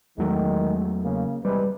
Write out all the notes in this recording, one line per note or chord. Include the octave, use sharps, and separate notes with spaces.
E2 D#3 F#3 G#3 A3
C#3 A#3
E2 C3 G3 G#3 B4